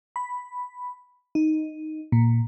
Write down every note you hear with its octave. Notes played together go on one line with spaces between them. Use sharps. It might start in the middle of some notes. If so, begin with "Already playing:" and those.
B5
D#4
A#2